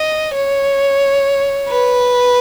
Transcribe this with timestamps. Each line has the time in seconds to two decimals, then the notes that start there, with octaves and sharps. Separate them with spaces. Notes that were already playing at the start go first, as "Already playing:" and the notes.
Already playing: D#5
0.34 C#5
1.69 B4